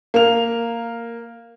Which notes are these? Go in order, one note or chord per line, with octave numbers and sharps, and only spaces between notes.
A#3 F7